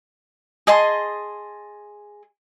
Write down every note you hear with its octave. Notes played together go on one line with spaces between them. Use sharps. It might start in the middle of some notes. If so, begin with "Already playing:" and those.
G#4 D#5 A5 C6